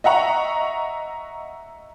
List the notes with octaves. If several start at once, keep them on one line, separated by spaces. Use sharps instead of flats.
D#5 E5 F#5 A#5 C#6